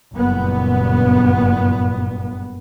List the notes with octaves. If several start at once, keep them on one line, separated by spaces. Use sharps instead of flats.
F#1 G2 A#2 B3